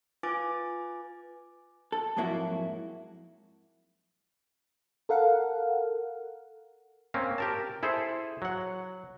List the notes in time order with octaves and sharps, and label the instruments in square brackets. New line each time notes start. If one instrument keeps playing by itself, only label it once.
[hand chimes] F4 B4 G#5 D6 A6
[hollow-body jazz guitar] A4
F2 G#2 F#3 A#3 E4 F#4
[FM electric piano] A4 A#4 F5 F#5
[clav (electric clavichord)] A#3 C4 C#4
G4 A#4 A5
E4 G#4 A4 C5
F#3 F#5